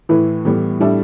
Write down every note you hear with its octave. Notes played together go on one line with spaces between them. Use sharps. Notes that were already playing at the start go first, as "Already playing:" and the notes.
A2 E3 A3 E4 B4
A2 E3 G3 B3
A2 G3 D4 A4 E5